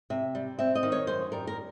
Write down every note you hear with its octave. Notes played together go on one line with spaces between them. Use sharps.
C3 E5
G3
C4 E5
D#5
D#3
C#5
F#2 C5
G3 A#4
A#4